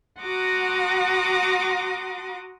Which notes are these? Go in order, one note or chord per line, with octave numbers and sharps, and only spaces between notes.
F#4 F#5 A#5 C6 D6 D#6